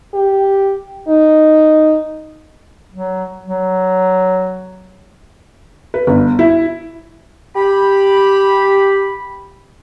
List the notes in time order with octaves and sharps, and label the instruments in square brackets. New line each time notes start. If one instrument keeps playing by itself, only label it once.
[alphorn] G4
D#4
[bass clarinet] F#3
F#3
[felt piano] B4
G1
E4
[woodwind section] G4 B5